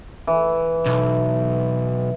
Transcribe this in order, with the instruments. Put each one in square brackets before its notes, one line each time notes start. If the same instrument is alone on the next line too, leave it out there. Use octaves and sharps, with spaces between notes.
[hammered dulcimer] E3
[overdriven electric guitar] B1